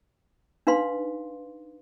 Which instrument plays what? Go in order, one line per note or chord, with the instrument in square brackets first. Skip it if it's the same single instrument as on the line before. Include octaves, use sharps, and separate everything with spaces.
[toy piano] D4 D#4 B4 F5 C6